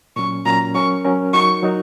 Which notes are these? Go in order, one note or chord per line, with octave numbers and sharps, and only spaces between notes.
A#2 F#3 C#4 C#6
A#2 F#3 C#4 A#5
F#3 C#4 A#4 C#6
F#3 C#4 A#4
F#3 D#4 F#4 A#4 C#6
F#3 D#4 F#4 A#4